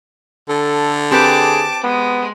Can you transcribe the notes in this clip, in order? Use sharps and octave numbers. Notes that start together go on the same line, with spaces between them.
D3 A4
C4 G4 G#4 B4 A5 D6
G#3 B3